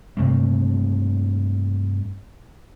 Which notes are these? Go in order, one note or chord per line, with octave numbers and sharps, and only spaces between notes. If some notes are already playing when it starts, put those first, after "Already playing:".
G2 C3 A3 A#3